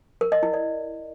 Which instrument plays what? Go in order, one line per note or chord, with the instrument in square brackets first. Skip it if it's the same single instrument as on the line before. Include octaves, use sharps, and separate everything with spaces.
[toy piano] A#4
D#5
E4
D5